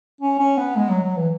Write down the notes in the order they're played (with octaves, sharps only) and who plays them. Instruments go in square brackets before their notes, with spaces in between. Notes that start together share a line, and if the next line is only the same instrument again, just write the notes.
[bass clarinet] C#4
C#4
B3
G#3
F#3
F#3
E3